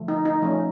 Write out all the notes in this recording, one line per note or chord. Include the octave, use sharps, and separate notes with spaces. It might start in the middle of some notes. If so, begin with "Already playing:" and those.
Already playing: D3 F3 A3
D#4
D#4
F3 A3 C#4